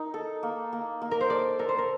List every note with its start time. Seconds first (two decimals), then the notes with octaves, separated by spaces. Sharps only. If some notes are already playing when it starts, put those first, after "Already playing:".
Already playing: D#4 A#4
0.14 A4
0.43 A#3
0.73 A#3
1.02 A#3
1.11 A#4
1.21 C5
1.30 A4 D5
1.59 A4 A#4
1.69 C5
1.78 A#4